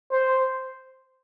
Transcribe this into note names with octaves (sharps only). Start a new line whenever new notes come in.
C5